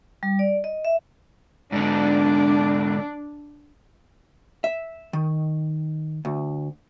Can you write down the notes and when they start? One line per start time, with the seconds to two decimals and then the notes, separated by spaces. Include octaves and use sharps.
0.23 G3
0.39 D5
0.64 D#5
0.85 E5
1.72 G#2 D3 D4
4.64 E5
5.13 D#3
6.25 D2